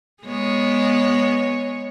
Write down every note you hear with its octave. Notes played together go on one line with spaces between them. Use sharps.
G#3 B3 C#5